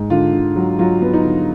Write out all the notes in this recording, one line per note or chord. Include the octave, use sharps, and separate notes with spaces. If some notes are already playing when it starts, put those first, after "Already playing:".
Already playing: G#2
D3 F4
D3
F#3
F#3 F4
B3
D#4
D3